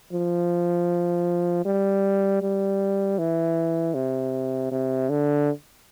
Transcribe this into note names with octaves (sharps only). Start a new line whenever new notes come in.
F3
G3
G3
E3
C3
C3
D3